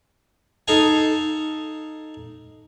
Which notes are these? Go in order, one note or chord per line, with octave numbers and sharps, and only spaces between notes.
D#4 A4 F5 G#5